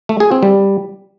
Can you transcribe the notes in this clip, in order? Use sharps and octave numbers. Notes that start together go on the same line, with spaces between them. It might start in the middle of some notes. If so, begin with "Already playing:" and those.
A3
G#4
C4
G3